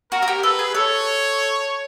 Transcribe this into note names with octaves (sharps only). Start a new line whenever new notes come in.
F#4 A#4
F#4
G4
A4 B4
G#4
A4 C#5